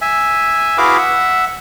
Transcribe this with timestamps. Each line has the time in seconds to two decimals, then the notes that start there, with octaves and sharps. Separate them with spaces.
0.01 E5 G#5
0.78 E4 F#4 G#4 B4 F5 D6
0.98 E5 F#5